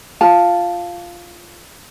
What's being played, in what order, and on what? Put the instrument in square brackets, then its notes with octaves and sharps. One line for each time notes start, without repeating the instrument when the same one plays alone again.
[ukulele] F4 A5